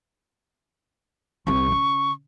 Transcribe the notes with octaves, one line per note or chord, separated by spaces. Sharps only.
C2 C3 C#6
C#3